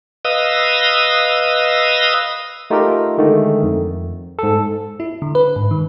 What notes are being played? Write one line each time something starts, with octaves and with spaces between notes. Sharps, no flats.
B4 D#5 F5 D#6 E6
A3 D#4 F4 G4 A4 A#4
D3 D#3 G#3 A3
F2
G#2 A4
E4
D3
B4
G#2
D#3